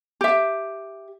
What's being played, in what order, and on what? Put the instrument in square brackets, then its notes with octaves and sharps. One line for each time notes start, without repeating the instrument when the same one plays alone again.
[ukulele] G4 E5